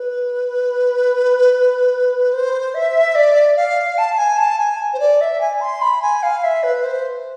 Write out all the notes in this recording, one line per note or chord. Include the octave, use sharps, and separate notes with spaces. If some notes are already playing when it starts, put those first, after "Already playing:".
Already playing: B4
C5
E5
D5
F5
A5
G#5
A5
G#5
C5
D5
E5
G#5
C6
B5
G#5
F5
E5
B4
C5